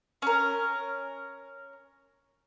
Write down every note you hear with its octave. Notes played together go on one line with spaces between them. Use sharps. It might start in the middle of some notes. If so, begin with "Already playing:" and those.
C#4 A#4